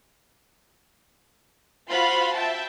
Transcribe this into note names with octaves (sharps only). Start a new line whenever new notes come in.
F4 F#4 C5 F5 B5 C6
E5 G5 A5